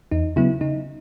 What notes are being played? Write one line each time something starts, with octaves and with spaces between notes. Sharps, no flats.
E2 D#4
C#3 F#3 B3 E4
C#3 D#4